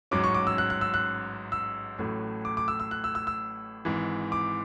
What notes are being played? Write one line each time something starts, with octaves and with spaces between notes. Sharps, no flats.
A1 G#2 F#3 C#4 D6
C#6
D6
E6
F#6
F#6
E6
F#6
E6
A1 A2 F#3 A3
D6
D6
E6
E6
F#6
E6
E6
E6
G#1 G#2 E3
D6